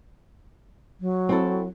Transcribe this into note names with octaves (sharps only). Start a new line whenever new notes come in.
F#3
C4 E4 A4